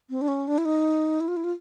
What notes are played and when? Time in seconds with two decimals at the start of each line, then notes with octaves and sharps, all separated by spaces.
0.10 C4
0.21 D4
0.28 C#4
0.48 D4
0.58 E4
0.65 D#4
1.20 E4
1.28 F4
1.37 E4
1.44 F4